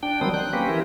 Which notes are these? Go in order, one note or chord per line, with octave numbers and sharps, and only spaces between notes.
D4 G5
D#3 F#3 G3 C4 D#6
F#6 G6
A#3 C4 C#4 G4 B4
E3 E4 G4 A#4